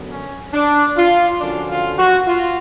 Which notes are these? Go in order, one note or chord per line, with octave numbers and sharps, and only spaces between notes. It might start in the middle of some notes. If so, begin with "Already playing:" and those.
Already playing: F#2 D3 F#3 B3
C#4
D4
F4
F#2 D3 F3 D4
F4
F#4
F4